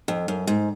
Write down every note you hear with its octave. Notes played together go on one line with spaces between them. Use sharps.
F2
F#2
G#2